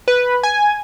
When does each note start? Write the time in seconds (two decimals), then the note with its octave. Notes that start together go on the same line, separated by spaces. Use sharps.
0.08 B4
0.43 G#5